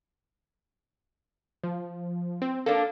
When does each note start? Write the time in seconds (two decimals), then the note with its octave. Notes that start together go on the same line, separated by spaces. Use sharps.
1.64 F3
2.42 C4
2.66 A#3 D4 A4